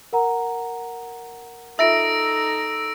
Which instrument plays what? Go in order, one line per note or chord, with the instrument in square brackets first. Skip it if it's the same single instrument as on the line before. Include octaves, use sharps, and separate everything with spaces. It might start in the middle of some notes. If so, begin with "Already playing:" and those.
[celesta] A#4 F#5 A#5
[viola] D#4 A4 [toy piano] F4 E5 [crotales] E6 A#6 D7